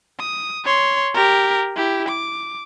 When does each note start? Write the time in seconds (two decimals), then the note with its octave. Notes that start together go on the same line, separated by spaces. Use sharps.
0.19 D#6
0.65 C#5 C6
1.14 G4 A#4
1.76 E4 G4
2.09 D6